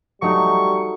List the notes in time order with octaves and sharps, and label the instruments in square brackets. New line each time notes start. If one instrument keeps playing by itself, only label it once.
[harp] F#3 A3 D#4 [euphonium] G3 [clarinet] C#6